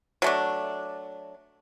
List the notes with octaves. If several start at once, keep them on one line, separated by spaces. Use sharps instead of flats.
F#3 A3 D4